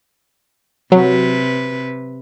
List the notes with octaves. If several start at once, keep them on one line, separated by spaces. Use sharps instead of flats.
C3 F#3 B4